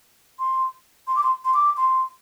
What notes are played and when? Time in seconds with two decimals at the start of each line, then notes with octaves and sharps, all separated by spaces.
0.39 C6
1.07 C6
1.16 D6
1.23 C6
1.45 C6
1.54 D6
1.77 C6